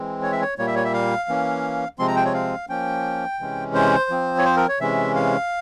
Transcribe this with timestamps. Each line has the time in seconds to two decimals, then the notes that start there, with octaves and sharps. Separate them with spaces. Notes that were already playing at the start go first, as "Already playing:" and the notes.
Already playing: E3 G#3 C4
0.23 C#5
0.32 E5
0.41 C#5
0.58 A#2 G3 A#3 C#5
0.67 E5
0.76 C#5
0.85 E5
0.93 F5
1.29 E3 A#3 C#4
1.99 C3 F3 G#3 C4 C6
2.08 A#5
2.16 G5
2.25 C#5
2.34 F5
2.69 F3 A#3 C#4 G5
3.40 C3 E3 G#3 C#4
3.75 C5
4.10 F3 C4
4.38 C#5
4.45 C5
4.57 A#4
4.68 C#5
4.80 C3 E3 G#3 C#4 E5
5.15 F5